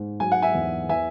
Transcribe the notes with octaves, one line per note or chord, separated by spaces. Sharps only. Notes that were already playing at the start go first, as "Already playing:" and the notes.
Already playing: G#2
F#3 G#5
F#5
E5 G#5
E2
E3 E5 G#5